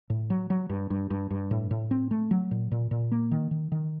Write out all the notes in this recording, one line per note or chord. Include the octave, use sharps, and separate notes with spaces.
A2
F#3
F#3
G2
G2
G2
G2
A2
A2
C4
A3
F#3
A#2
A#2
A#2
A#3
D#3
D#3
D#3